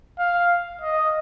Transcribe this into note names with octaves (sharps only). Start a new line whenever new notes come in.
F5
D#5